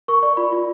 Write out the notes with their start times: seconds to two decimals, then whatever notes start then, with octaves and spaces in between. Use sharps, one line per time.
0.08 A#4 C#6
0.23 D5 C#6
0.37 F4 B5
0.52 F4